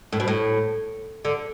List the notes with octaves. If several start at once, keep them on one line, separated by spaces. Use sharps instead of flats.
A2
B2
A2
D3